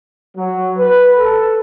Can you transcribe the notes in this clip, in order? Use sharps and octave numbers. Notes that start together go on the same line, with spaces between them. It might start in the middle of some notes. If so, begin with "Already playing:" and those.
F#3
B4
A4